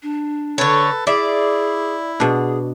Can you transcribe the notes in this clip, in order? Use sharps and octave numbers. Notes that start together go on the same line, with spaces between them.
D4
D3 A4 B4 C#5 A5
E4 G#4 D5 E5
B2 D4 G#4